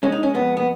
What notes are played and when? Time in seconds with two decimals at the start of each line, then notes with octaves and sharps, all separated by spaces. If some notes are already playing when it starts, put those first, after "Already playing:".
0.03 G#3 C#4
0.12 D#4
0.23 C#4
0.34 F2 B3
0.57 B3